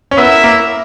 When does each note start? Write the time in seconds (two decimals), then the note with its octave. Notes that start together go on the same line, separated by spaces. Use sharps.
0.11 C#4
0.17 B3 E4 A#4 E5
0.44 A#3